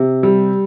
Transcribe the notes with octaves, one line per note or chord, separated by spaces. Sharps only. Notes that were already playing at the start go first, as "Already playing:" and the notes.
Already playing: C3
G3